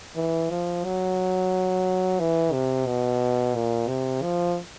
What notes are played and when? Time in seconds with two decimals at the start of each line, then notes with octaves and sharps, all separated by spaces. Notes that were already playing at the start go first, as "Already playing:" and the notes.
0.16 E3
0.50 F3
0.84 F#3
2.20 E3
2.52 C3
2.87 B2
3.55 A#2
3.88 C3
4.23 F3